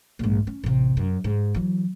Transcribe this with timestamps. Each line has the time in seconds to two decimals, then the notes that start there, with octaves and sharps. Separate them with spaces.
0.19 A#1 G#2
0.47 C#4
0.64 A1 C3
0.97 F#2
1.24 G#2
1.54 E3 F#3